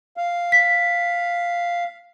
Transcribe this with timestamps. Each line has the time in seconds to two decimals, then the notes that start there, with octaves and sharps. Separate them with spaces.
0.17 F5
0.52 B6